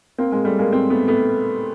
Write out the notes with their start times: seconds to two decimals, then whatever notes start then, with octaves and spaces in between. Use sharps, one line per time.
0.18 A#3 C4
0.32 G#3 A#3
0.45 G3 A3
0.59 G#3 A#3
0.72 A#3 C4
0.90 A3 B3
1.08 A3 B3